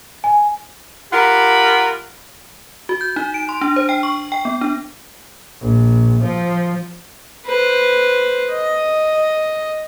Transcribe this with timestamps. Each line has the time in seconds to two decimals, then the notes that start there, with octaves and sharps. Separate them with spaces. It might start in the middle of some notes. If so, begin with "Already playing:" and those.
0.24 G#5
1.12 F4 G4 A#4 F#5 B5
2.89 F#4
3.01 G6
3.16 D#4
3.34 D7
3.49 C6
3.61 D4
3.76 C5
3.89 G5
4.03 C#6
4.32 G5
4.45 B3
4.61 D4
5.61 A#1
6.23 F3
7.46 B4 C5
8.53 D#5